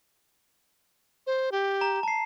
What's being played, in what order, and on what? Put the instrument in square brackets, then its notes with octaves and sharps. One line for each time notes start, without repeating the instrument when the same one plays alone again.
[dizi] C5
G4
[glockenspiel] A#5
A5 C7